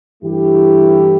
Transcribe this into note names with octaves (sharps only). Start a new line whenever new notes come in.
G2 E3 A3 E4 G4